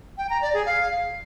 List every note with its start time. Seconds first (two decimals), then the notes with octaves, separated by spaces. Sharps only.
0.18 G5
0.30 A#5
0.42 D5
0.54 G#4
0.66 F5